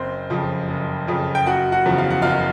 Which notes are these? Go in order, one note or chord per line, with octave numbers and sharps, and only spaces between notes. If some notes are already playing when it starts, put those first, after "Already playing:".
Already playing: F#1 C4 C5
F2 C#3 F3
F#1
F2 C#3 F3
G5
F#1 F#4 F#5
F#4 F#5
E2 C#3 F3
F5
F#5
F#1 F4 F5